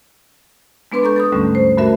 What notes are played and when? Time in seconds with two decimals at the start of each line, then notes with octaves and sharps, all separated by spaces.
0.92 G#3 B3 D4 B4 C6 D6
1.03 A4 A#5 C#6 G6
1.16 A4 B5 D#6
1.32 D#2 G#2 D3 G3 A3 C#4
1.55 C5
1.77 G2 A3 F#4 A#4 E5 B5